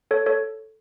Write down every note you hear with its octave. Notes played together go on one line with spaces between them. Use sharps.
A4 C#5
A4 C#5